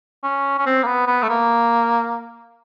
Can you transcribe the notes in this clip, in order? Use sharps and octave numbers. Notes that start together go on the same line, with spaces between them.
C#4
C#4
C4
A#3
B3
B3
A3
A#3